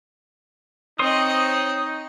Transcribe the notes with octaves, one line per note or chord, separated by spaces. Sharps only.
C4 D#4 C#5 D#5 C6 D#6